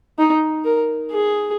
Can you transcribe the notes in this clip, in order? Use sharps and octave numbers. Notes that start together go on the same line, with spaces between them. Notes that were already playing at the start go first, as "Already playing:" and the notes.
D#4
A#4
G#4